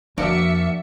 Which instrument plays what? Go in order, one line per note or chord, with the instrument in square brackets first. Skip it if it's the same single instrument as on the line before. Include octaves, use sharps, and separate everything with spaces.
[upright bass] F2 [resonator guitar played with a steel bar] A#3 D4 D5 [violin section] F#4 E5 C#7